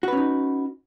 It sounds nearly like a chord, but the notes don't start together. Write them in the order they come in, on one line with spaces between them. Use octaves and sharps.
F#4 B4 C#4 D#4